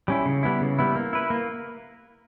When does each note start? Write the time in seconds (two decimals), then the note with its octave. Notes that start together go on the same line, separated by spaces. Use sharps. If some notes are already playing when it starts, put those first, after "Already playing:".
0.08 G3 C#4 E4
0.26 C#3
0.43 G3 B3 E4
0.61 C#3
0.79 G3 B3 E4
0.95 A#3
1.13 E4 B4
1.30 A#3